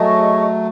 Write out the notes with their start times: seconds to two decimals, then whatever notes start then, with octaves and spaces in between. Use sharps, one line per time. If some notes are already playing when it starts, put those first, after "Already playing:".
Already playing: F#3 A3 G#4 D#5 A5 C#6